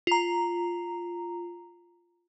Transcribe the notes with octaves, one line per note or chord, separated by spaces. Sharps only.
F4 A#5